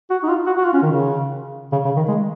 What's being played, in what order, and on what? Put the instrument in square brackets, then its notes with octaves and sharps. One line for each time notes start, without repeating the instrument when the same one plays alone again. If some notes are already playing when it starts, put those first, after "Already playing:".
[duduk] F#4
D#4
F4
F#4
F#4
F4
C#4
D#3
C#3
C#3
C#3
D#3
G#3